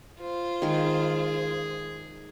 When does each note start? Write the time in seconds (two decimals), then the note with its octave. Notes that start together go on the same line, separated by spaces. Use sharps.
0.20 F4 C5
0.62 D#3 G#3 G#4